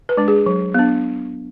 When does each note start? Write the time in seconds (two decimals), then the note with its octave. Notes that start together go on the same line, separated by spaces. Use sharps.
0.09 B4
0.17 G#3 D4
0.28 G#4
0.46 F#3
0.74 B3 D4